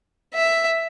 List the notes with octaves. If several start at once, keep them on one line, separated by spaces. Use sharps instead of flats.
E5